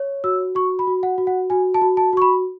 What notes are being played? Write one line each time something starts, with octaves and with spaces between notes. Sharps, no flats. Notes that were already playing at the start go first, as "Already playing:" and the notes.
Already playing: C#5
F#4 E6
F#4 C#6
B5
F#4
F#5
F#4
F#5
F#4 G#5
A5
F#4
A5
F#4 C#6
B5